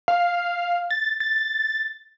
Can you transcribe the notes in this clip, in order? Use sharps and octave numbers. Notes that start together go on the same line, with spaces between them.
F5
A6
A6